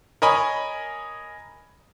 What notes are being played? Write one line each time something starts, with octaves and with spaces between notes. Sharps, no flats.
A#4 C#5 D#5 G#5 B5